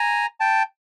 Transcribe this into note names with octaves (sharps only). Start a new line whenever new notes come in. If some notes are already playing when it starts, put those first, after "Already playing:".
Already playing: G#5 A#5
G5 A5